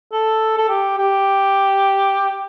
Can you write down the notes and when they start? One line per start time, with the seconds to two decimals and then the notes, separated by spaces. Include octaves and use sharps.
0.12 A4
0.58 A4
0.69 G4
0.98 G4